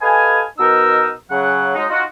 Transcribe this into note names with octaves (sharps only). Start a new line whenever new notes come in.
G4 A4 B4 D#5 F5 G#5
B2 D#4 A#4 E6
C#3 F#3 F#5
F#3 G#3 D#4
D#4 F4 F#4